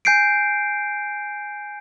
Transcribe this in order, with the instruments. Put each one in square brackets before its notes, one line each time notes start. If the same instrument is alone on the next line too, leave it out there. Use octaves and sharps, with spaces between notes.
[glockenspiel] G#5 G6 C7 D7